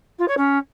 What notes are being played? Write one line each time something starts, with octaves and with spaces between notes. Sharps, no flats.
F4
C#5
C#4